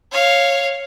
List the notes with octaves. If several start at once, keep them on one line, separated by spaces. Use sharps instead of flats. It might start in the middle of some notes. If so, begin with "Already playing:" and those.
C#5 F5